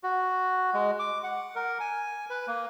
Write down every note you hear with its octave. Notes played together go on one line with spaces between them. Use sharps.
F#4
G#3
D6
F#5
A#4
G#5
B4
A#3